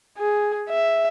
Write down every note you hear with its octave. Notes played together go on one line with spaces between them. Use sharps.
G#4
E5